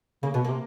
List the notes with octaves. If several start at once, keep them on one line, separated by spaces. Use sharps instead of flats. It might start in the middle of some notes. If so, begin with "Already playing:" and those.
C#3 A#3
B2 B3
C3 A#3